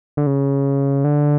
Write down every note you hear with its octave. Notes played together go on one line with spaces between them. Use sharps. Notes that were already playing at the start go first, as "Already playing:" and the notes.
D3
C#3
D3